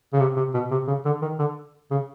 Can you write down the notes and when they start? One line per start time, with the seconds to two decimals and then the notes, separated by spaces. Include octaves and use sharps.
0.13 C#3
0.20 C3
0.37 C3
0.54 B2
0.71 C3
0.88 C#3
1.05 D3
1.22 D#3
1.39 D3
1.91 C#3